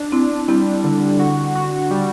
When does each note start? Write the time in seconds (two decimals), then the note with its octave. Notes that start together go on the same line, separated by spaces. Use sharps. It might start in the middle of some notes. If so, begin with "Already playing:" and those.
Already playing: D4
0.12 C4 D4 E4
0.48 G3 C4 E4
0.84 D3
1.19 F#4
1.55 F#4
1.91 G3